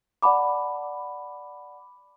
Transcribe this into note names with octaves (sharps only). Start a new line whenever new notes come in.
D5 F#5 A5 B5 D6